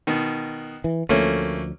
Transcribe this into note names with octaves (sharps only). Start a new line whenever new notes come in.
B2 D#3
E3
D2 F3 A3 A#3 C#4